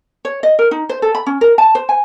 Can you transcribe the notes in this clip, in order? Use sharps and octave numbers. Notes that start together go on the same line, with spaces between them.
C#5
D#5
A#4
D#4
C5
A4
B5
C#4
A#4
A5
C5
G#5